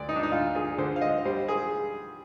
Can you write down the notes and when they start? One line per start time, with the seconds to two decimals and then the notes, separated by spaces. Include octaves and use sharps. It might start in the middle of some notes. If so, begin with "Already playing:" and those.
Already playing: D2 D5
0.09 D#4
0.16 D4
0.23 D#4
0.32 D2 F4
0.55 G#4
0.78 D3 C5
0.96 F5
1.01 D#5
1.25 G3 C5
1.48 G#4